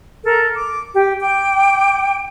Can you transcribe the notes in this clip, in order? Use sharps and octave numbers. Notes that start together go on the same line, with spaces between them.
A4 A#4
D6
G4
G5 D6